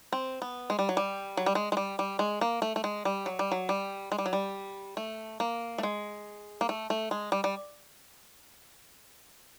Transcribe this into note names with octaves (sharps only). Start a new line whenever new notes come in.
C4
B3
G#3
G3
F#3
G3
F#3
G3
G#3
G#3
G3
G3
G#3
A#3
A3
A3
G#3
G3
F#3
G3
F#3
G3
G#3
G3
F#3
G3
A3
A#3
A3
G#3
A#3
A3
A3
G#3
G3
G3